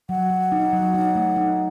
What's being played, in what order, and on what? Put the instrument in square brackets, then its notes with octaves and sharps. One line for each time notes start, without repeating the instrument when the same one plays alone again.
[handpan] F#3 [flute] F#5
[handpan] F#3
D#4
F#3
D#4
A3
D#4